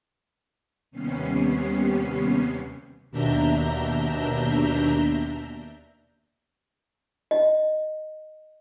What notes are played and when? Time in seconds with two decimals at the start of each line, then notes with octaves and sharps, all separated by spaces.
0.91 D#2 C3 G3 B3 C#4 C7
3.10 D#2 B2 D4 E5 A#5 G6
7.31 D#5